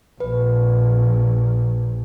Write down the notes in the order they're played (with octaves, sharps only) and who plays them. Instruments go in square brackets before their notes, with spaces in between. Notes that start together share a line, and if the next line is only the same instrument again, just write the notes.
[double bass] A#1 [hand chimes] B4